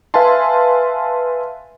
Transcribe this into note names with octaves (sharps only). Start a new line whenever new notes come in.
B4 E5 F5 G#5 A5 C6